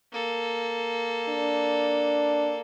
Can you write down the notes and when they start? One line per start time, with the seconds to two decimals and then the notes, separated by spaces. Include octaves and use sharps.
0.12 A#3 A4
1.29 D4